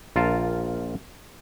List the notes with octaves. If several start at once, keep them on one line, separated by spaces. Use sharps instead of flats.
A#1 F4 A#4 F5 A5